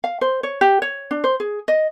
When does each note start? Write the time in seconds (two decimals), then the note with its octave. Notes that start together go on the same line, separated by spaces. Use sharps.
0.04 F5
0.21 C5
0.43 C#5
0.61 G4
0.82 C#5
1.11 D4
1.24 C5
1.40 G#4
1.68 D#5